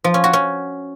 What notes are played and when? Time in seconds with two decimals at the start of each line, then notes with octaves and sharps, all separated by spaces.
0.04 F3
0.14 C#4
0.24 F#4
0.33 C#4